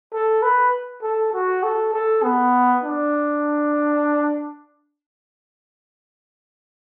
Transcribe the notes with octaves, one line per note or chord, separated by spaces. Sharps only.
A4
B4
A4
F#4
A4
A4
B3
D4